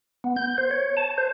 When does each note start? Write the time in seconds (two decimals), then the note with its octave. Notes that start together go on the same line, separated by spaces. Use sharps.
0.24 B3
0.36 G6
0.58 C5
0.71 C#5
0.97 A5
1.18 C5